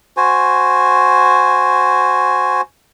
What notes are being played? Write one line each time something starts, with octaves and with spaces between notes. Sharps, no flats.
F#4 C5 G#5